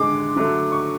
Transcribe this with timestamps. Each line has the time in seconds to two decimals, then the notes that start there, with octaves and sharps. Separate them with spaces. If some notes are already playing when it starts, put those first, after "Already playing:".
Already playing: D3 G#3 D6
0.36 D3 F#3 A3
0.72 C#6